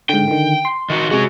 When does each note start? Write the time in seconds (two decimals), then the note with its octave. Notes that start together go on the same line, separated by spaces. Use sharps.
0.09 G#2 D3 G5
0.28 D3 D#3
0.65 C6
0.90 D#3 F#4
1.11 C3 G#3 C#4 F#4